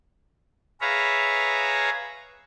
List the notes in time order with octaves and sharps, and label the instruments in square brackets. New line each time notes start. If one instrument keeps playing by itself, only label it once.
[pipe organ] G#4 B4 C#5 E5 F5 A#5